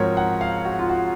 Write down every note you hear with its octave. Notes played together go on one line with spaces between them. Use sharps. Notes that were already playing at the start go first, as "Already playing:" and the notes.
Already playing: G#2 F3 C4 F#4 A#4 C#5
F#5
F5
F#4
F4
F#4